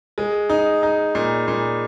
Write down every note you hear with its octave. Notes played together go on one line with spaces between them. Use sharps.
G#3
D#4
D#4
A#2
A#2